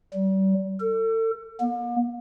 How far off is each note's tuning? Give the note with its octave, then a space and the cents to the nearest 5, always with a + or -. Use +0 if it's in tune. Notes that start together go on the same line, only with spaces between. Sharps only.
G3 -35
A4 +35
A#3 +45